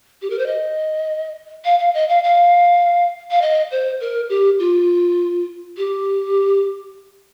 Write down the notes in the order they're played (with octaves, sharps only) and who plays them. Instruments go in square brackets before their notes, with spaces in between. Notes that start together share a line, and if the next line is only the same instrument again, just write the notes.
[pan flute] G4
A#4
C5
D#5
F5
F5
D#5
F5
F5
F5
D#5
C5
A#4
G4
F4
G4